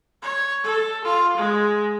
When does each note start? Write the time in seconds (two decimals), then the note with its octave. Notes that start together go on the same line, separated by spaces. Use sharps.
0.22 C#5
0.64 A4
1.05 F4
1.37 G#3